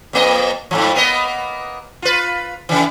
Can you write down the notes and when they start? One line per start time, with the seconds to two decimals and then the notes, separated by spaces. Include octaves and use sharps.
0.13 F2 A#3 D#5
0.71 F2 G#2 F3
0.94 A#3 B3 D#5
2.02 F4 B4
2.69 C#3 E3